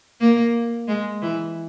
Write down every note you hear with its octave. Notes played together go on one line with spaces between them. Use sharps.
A#3
G#3
E3